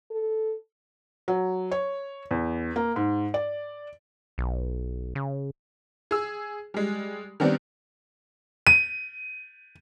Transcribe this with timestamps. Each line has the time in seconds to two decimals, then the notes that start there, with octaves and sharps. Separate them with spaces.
0.11 A4
1.28 F#3
1.71 C#5
2.31 E2
2.76 A#3
2.96 G#2
3.34 D5
4.38 B1
5.15 C#3
6.11 G#4 E6
6.74 G3 G#3
7.40 D#3 G3 B3 C4 D4
8.67 D#7